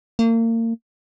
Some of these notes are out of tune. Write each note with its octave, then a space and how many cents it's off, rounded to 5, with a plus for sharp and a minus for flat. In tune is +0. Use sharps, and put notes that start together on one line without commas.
A#3 -35